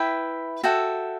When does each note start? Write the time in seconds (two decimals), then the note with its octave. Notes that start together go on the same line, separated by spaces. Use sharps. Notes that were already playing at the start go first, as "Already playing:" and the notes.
Already playing: E4 B4 E5 G5
0.63 F#4 A4 E5 G5